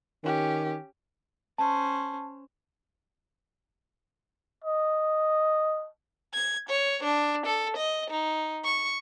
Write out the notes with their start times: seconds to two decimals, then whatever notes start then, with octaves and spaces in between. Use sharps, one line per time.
0.24 D#3 C#4 G4
1.58 C#4 C5 A5
4.64 D#5
6.34 G#6
6.69 C#5
7.03 D4
7.46 A4
7.77 D#5
8.10 D#4
8.64 C#6